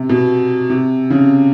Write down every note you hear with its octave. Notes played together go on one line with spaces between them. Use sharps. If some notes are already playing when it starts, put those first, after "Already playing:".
Already playing: C3
B2
C3
C#3